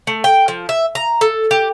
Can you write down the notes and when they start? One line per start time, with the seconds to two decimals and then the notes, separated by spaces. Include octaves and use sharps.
0.07 A3
0.24 G5
0.48 F3
0.69 E5
0.95 A#5
1.21 A4
1.51 G4